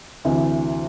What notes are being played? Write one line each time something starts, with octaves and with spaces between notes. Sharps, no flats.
D2 C3 E3